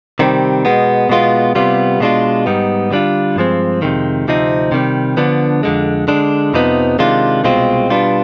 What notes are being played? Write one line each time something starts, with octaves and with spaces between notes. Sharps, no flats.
C3 D#3 G3 C4
B2 G#3 B3
B2 G#3 B3 F4
C3 G3 B3 F4
B2 G#3 D4 F4
G#2 G3 B3 D#4
D3 G3 D4 F4
G2 F3 G#3 C4
F2 C3 D#3 G#3
D2 C3 F3 C4 D#4
C3 D#3 G3
D3 F3 B3 D4
F2 D3 G#3
D3 G#3 D4
F2 C3 F3 B3 D#4
C3 D#3 G#3 D4 F4
C2 B2 G#3 C4 F4
B2 G3 B3 D4 F4